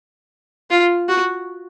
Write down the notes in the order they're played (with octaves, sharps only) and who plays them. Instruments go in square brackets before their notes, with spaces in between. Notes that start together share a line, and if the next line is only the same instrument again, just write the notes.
[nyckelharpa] F4
F#4